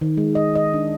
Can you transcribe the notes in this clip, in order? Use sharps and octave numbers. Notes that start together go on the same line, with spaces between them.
D#3
G#3
D#5
D#5
D4